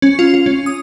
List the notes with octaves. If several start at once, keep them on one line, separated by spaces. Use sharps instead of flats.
C#4
F4
F4
C#4
D#6